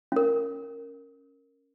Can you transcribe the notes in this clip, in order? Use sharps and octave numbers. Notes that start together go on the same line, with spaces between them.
C#4 A#4